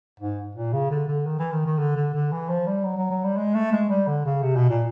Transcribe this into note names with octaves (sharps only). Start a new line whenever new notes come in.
G#2
A#2
C#3
D3
D3
D#3
E3
D#3
D#3
D3
D3
D3
E3
F3
G3
F#3
F#3
F#3
G3
G#3
A3
G#3
G3
D3
C#3
C3
B2
A#2